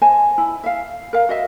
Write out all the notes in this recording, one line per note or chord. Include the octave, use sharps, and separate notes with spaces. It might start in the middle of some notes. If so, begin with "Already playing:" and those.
C5 D#5 G#5 A5
E4
E5 F5
A#4 F5
F#4 D#5 E5